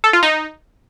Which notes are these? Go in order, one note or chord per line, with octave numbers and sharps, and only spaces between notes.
A4
F4
D#4